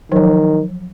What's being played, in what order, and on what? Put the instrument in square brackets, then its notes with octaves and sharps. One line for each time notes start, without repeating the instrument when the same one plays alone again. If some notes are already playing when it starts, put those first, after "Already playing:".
[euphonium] D#3 [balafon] F3 F#3